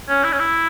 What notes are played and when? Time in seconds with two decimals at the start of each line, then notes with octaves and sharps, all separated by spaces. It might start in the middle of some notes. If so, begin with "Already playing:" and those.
0.09 C#4
0.24 E4
0.32 C#4
0.39 E4